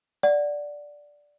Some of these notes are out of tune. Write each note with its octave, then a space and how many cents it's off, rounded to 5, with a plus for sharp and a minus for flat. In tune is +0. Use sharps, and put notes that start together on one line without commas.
D5 +0 F#5 +0